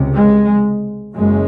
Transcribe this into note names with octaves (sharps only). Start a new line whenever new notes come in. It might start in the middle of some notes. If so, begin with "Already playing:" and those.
Already playing: C#2 C3
G#3
F#1 F#2 C#3 G#3